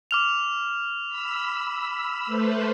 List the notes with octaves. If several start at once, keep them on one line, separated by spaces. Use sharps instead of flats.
D6 F6 F7
B5 E6
A3 B4 C5